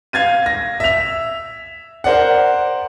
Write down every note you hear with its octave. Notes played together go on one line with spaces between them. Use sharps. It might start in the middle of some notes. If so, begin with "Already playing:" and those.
F5 G#6 A6 D#7
A#6
E5 F7
A#4 C5 D5 F#5